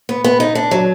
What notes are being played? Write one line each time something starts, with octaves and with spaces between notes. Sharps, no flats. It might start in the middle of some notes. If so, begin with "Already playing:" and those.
B3
B3
D#4
D4
F#3